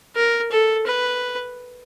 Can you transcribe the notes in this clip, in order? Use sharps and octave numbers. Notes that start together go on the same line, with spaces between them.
A#4
A4
B4